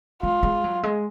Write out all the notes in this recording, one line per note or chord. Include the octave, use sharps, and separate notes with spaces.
G#3 F4
G#3
F#3
G#3